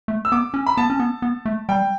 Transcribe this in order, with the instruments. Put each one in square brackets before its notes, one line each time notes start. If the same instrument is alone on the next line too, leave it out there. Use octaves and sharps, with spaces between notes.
[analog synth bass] A3
[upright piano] E6
[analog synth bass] B3 [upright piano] D6
[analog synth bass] C#4
[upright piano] B5
[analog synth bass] B3 [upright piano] A5
[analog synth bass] C#4
B3
B3
A3
[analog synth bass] G3 [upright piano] G5